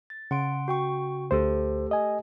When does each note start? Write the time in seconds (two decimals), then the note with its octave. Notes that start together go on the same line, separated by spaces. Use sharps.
0.10 A6
0.31 C#3 F#5 C6 D7
0.68 F#4 G5 C#6
1.31 D2 A3 G4 A4 C5
1.91 D#5 G#5